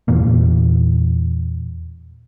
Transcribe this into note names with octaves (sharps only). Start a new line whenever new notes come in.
E2 A#2 E3 A#3